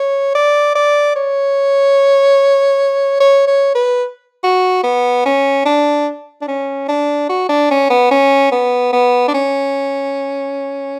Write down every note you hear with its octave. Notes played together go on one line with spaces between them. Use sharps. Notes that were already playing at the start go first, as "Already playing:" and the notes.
Already playing: C#5
D5
D5
C#5
C#5
C#5
B4
F#4
B3
C#4
D4
D4
C#4
D4
F#4
D4
C#4
B3
C#4
B3
B3
D4
C#4